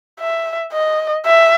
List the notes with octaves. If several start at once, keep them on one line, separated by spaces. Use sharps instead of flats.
E5
D#5
E5